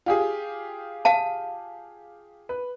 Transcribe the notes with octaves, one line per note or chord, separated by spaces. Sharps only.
F4 G4 G#4
F5 A5
B4